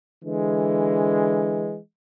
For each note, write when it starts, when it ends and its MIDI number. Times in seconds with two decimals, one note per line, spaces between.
0.24 1.78 50
0.24 1.78 52
0.24 1.78 56